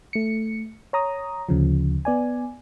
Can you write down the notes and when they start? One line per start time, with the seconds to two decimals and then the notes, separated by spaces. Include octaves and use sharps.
0.13 A3 C#7
0.93 C#5 A#5 D#6
1.49 D2 C#3 F3
2.05 B3 D5 G#5